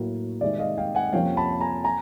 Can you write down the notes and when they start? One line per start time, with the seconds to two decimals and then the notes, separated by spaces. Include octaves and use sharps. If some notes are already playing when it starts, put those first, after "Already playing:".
Already playing: A2 F#3 A#3
0.41 C3 D#3 G#3 C4 D5 E5
0.59 D#5 F5
0.78 F5 G5
0.95 F#5 G#5
1.13 F2 C3 F3 A#3 C#4 F5 G5
1.37 A5 B5
1.60 G#5 A#5
1.84 G#5 A#5